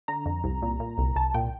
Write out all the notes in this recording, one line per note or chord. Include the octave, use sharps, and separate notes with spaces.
D3 A#5
F2
C2
A#2
A#2
C2
C2 A5
A#2 G5